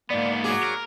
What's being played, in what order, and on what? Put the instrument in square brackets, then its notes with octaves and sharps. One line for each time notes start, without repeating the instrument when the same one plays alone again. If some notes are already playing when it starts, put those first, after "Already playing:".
[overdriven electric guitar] G#2 B3 [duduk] A#3 [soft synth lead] D5
[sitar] F#3 G#4 [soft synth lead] D6
[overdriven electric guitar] A#4